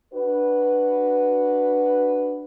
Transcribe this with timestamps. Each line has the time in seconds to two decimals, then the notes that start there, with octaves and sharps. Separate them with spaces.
0.14 D4 F#4 B4